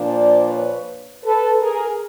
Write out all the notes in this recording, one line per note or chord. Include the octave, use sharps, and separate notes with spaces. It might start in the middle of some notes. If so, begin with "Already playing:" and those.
Already playing: A#2 F3 A#3 D4
C5 D5
B4 C#5
A4 B4
G#4 A#4